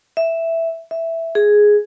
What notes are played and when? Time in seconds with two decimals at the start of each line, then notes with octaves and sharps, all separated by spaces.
0.17 E5
0.91 E5
1.35 G#4